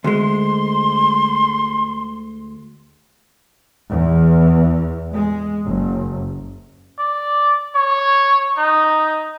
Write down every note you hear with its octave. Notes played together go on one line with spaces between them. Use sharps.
D2 G#3 C6
E2
G#3
F#1
D5
C#5
D#4